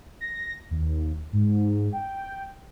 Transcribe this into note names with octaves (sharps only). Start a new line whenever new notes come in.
A#6
D#2
G#2
G5